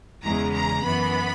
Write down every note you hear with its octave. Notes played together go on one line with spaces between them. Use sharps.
E2 C#3 G#3 A#5
A#5
F#2 E3 B3 B5